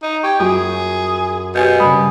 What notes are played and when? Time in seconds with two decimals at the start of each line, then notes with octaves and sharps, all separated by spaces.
0.03 D#4
0.23 G4 C#6 G#6
0.40 F#2 F4 G#4
1.55 B2 G4 G#5 G6
1.80 G2 C#3 G#5 B5 D#6